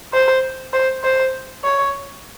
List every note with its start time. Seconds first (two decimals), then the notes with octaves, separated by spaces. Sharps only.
0.13 C5
0.73 C5
1.04 C5
1.64 C#5